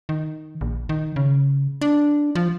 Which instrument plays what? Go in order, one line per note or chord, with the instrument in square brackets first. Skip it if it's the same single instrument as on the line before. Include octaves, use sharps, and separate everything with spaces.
[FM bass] D#3
A#1
D#3
C#3
D4
F3